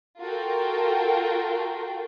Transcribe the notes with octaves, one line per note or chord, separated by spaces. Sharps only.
F4 F#4 A4 A#4 G5